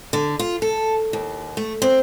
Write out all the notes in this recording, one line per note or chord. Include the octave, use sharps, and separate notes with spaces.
D3
F4
A4
D#2
A3
C4